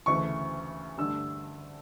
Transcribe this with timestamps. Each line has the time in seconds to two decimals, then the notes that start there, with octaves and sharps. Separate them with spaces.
0.06 D2 C#3 E3 A3 C#6
0.98 G2 D3 A3 E6